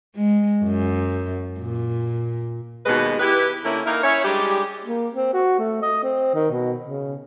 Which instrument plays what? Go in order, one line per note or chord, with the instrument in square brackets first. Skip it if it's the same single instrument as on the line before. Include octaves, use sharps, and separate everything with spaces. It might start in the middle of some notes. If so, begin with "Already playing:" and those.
[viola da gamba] G#3
F#2
A#2
[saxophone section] D#2 B2 G#3 F#4 B4 D#5
E4 G4 B4
D3 A#3 C#4 E4
A#3 D#4 E4 A#4
C#4 E4 C#5
G3 G#3 D4 G4
[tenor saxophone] A#3
C4
F#4
A3
D#5
C4
D#3
B2
C#3